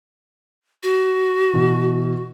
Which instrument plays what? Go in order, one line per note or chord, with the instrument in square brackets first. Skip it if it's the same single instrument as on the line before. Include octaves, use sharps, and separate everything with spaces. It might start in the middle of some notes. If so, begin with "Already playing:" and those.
[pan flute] F#4
[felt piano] B2 E3